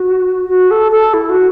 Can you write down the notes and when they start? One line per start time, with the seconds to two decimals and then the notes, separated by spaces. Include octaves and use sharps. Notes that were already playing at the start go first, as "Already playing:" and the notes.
Already playing: F#4
0.49 F#4
0.70 A4
0.92 A4
1.13 E4
1.29 F#4